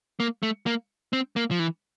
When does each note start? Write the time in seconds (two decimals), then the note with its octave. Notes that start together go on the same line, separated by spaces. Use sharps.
0.20 A#3
0.43 A3
0.66 A#3
1.13 C4
1.36 A#3
1.51 F3
1.59 E3